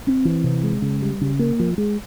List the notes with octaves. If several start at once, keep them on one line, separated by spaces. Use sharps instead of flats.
C4
E3
C3
G#3
C#3
G3
C#3
A#3
F3
G#3